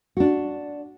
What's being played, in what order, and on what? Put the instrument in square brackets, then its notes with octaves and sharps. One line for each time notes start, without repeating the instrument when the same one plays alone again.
[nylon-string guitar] D4 F#4